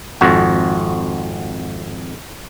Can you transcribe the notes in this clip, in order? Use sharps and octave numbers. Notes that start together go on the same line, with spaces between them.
G#1 F2 F#4